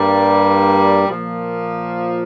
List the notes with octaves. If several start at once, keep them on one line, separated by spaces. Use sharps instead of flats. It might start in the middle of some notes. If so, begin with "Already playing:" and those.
Already playing: G2 G3 A#3
A#2 F3 A#3